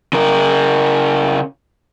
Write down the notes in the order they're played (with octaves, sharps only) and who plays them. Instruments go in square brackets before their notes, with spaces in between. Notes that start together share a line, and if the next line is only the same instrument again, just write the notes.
[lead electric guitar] C#3 A#4